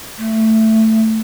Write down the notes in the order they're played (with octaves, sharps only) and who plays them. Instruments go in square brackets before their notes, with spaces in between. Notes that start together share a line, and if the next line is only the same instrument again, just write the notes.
[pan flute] A3